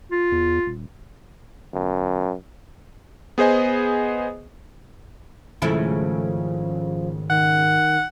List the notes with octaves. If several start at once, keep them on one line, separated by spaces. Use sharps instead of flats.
F4
E2
D#1
G1 F#2
B3 G#4 C5 D#5 G#5
G#1 C#3 F3 A3 E4
D#3 F#5